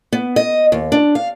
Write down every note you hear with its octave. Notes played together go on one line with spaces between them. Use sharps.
B3
D#5
D#2
D4
F5